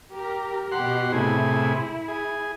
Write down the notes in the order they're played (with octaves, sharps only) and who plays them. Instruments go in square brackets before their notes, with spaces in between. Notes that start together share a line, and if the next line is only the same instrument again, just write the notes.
[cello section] G4 A#4
[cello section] B2 G4 [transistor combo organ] F#5 C6
[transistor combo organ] A2 C3 G#4 [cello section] E4
[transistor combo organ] G#4